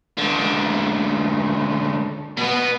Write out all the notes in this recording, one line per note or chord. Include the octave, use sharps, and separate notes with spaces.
C#2 D3
B2 B3